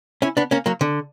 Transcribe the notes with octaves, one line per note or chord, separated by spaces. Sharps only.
C#4 E4
B3 D4
A#3 C#4
F#3 A#3
D3